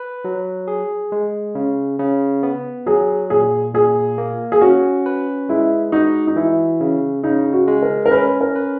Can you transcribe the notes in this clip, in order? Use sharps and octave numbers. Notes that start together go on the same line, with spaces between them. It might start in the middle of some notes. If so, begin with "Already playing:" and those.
Already playing: B4
F#3
G#4
G#3
C#3
C#3
B3
F#3 G#4
A#2 G#4
A#2 G#4
A#3
G#4
C#4 F#4
B4
G#3 E4
D#4 F#4
D#4
E3 E4
C#3
C#3 D#4
F#4
G#3
A#4
A#4
C#4 B4
A#4
B4